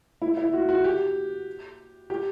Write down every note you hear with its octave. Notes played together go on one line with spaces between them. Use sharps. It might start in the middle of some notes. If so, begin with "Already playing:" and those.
E4
E4
F#4
F#4
G4
G4